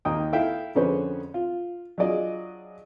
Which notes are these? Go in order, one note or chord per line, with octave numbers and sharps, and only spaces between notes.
D#2 A#3 D#4 G5 D#6
E4 A4 E5 F5 G5
F2 D3 C#4 G#4 B4 C5
F4
F#3 D4 F4 G#4 D5 D#5